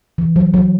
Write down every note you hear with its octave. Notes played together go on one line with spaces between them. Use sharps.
E3
F#3
F#3